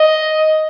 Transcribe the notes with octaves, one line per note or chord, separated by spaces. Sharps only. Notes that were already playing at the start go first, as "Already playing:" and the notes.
Already playing: D#5